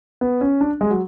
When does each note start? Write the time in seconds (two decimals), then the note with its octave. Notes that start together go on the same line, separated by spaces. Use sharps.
0.21 B3
0.41 C#4
0.61 D4
0.81 G#3
0.91 F#3